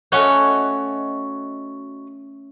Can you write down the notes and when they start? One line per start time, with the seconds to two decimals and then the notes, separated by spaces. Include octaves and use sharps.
0.12 A3 C#4 F#4 C#5 D#5 F#6